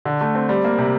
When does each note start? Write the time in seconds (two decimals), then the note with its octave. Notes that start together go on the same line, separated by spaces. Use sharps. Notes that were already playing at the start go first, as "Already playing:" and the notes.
0.05 D3
0.21 A3
0.35 C4
0.49 G3
0.65 A#3
0.78 C3